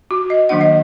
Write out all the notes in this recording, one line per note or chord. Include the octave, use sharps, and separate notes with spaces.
F#4
D#5
D#3 F#3 A#3 D4 F#5
D#5